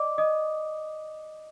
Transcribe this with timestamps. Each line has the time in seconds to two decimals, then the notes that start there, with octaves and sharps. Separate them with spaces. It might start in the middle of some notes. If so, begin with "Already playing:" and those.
Already playing: D5 D#5 D6
0.18 D#5 D#6